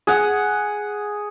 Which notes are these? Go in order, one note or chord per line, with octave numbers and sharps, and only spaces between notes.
G#4 F#5